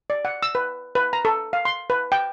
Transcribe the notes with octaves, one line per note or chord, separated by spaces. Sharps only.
D5
F#5
E6
B4
B4
A#5
A4
F5
C6
B4
G5